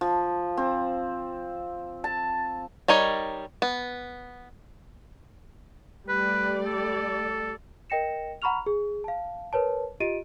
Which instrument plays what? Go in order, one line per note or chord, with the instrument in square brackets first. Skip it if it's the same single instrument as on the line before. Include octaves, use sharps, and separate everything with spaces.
[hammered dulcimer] F3
C4
A5
[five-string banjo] G3 D#4 A#4 C#5
B3
[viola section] G3 A3 D5 [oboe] B4
[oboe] A4
[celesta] A#4 D#5 G5 A#6 C#7 E7
F#5 A#5 B5 C#6 F6 F7
G#4
F5 A5
A#4 B4 C#5 A5
F4 G4 D#5 D7 D#7